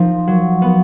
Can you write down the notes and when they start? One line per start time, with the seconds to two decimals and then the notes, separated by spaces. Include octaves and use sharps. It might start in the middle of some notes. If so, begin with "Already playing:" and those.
Already playing: F3 C4 D#4
0.27 F#3
0.62 B3